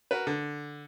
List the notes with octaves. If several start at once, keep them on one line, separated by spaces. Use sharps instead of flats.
F#4 A#4 B4
D3